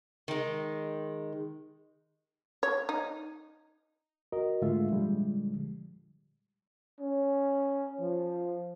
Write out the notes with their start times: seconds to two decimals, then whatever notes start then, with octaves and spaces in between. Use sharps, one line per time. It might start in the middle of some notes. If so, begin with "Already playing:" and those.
0.28 D#3 G#3
2.63 C#5
2.89 D#4
4.32 F#4 A#4 D#5
4.62 G#2 D3 G#3 A3 F4 E5
4.90 A#2 D3 F3 G3 G#3
7.00 C#4
8.01 F3